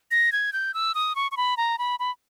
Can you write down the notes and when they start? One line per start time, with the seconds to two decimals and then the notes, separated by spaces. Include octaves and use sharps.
0.11 A#6
0.32 G#6
0.53 G6
0.74 E6
0.95 D#6
1.15 C#6
1.31 C#6
1.37 B5
1.57 A#5
1.78 B5
1.99 B5